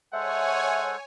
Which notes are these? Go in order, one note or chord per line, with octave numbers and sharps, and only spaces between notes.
G#3 A4 C5 C#5 E5 F#5 G#5